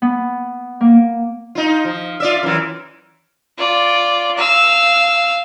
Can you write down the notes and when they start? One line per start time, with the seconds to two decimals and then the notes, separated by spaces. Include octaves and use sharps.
0.02 B3
0.81 A#3
1.55 D#4 F4
1.85 F3
2.20 F4 D5 E5
2.43 F#2 E3
3.58 F4 D5
4.37 F5 E6